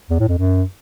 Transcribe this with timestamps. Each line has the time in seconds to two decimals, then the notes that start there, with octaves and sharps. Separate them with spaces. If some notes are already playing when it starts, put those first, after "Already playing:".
0.10 E2
0.19 A2
0.28 F2
0.38 F#2